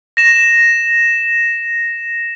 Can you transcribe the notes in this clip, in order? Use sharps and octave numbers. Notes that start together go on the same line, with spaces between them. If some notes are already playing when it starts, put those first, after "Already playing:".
A#6 E7